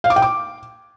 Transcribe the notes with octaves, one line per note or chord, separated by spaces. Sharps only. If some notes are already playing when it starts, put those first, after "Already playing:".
F5
D6
G5
D6